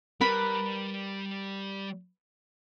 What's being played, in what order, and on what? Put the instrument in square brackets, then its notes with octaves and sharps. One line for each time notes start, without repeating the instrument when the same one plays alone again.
[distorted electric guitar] G3 [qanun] A#4 B4 B5